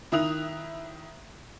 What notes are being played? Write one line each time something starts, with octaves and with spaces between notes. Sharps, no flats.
D#3 E4 E5 D#6 F#6 F7